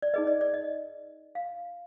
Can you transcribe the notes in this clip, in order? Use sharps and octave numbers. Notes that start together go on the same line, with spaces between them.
D5
D#4 G#4 B4 D#5
D5
D5
D#5
F5